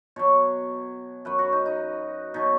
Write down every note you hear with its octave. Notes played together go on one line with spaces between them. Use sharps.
B2 F#3 C#5
F#2 F#3 B4
F#4
D#4
D#4
B2 F#3 D#4